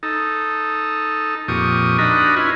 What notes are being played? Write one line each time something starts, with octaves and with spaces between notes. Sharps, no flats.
D#4 A4
F2 A#2 G4 C#6 D#6
D4 D#4 F#4 A#4 D#5 B5
C#4 E4 F4 B4 G#5